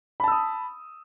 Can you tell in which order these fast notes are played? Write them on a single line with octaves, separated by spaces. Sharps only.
B5 A5 E6 D#6